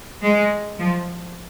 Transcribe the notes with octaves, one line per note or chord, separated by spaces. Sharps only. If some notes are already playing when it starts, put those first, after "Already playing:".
G#3
F3